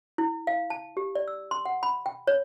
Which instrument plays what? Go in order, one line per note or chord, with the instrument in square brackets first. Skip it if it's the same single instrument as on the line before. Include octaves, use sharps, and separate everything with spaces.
[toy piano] E4
F5
A5
G4
D5
E6
C6
F#5
B5
G5
C#5